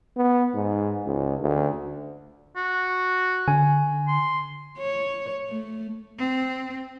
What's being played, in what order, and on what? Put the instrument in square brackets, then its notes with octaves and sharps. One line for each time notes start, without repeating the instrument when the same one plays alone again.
[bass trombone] B3
G#2
C#2
D2
[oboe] F#4
[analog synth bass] D3 [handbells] G#5
[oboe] C6
[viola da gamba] C#5
A3
[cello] C4